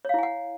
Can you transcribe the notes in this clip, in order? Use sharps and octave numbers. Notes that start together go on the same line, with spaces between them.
E4 C#5 F5 F#5 G#5